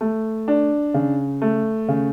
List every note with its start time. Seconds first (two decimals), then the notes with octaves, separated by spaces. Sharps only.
0.01 A3
0.48 D4
0.94 C#3
1.42 A3
1.88 C#3